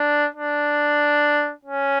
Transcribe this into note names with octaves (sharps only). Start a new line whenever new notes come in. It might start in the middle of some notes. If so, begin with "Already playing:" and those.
Already playing: D4
D4
C#4